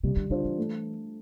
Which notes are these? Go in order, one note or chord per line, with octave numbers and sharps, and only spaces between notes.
C3 G3
D3
D3 D4 F4 C5
E3
A3